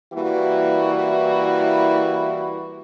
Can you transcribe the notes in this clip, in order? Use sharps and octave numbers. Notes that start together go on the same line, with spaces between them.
E3 G3 A#3 E4 F#4